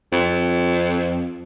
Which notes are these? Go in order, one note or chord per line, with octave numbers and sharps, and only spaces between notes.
F2